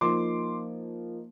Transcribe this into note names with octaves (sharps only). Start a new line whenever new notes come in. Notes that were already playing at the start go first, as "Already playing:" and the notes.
F3 A#3 D#4 C6 D6